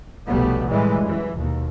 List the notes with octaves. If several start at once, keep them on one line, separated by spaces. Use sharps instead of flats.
F1 B1 G3 A3 B3
A2 E3 G3 G#3
F#2 E3
D#2 B2